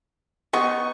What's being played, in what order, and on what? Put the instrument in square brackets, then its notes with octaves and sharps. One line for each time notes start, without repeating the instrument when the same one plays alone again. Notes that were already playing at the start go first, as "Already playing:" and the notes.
[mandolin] B3 D#4 [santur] C#6